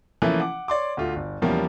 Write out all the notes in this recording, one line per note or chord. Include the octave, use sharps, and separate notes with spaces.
E3 F3 A3 A#3 C#4 E4
F#5 D6
C#5 D5 C6 D6
D2 A3 F4
G1
E2 F3 G3 A#3 C#4 E4